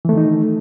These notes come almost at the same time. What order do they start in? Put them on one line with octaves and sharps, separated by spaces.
E3 A3 D#3 D#4